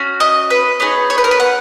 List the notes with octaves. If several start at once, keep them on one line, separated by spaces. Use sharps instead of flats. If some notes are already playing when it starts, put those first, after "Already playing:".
Already playing: C#4 F#4
D#5
B4
B3 D#4 G#4 C#5
C#5
B4
A#4
B4
F#5